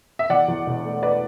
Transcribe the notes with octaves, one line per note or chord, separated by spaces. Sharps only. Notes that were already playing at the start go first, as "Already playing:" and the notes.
E5
E2 D5 F#5
E2
E1
A3
B4 D5